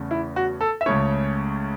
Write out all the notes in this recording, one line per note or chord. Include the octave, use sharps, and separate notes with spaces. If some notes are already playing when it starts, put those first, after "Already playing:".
Already playing: E2 C#3 A3 C#4
E4
F#4
A4
E5
C#2 C#3 A3 C#4 C#5